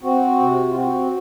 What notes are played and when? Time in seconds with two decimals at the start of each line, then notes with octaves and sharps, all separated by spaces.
0.03 C4 F#4
0.39 C3
0.71 F4
0.75 C4 F#4